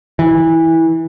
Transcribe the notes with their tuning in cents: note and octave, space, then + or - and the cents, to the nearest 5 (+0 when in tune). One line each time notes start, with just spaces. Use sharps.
E3 -15